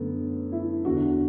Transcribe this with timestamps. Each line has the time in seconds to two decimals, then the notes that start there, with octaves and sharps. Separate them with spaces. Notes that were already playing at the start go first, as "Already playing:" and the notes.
Already playing: F#2 D3 A3 B3
0.52 E4
0.85 E2 D3 F#4